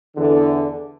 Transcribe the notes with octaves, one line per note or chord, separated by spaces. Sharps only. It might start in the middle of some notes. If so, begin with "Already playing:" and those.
E2 D3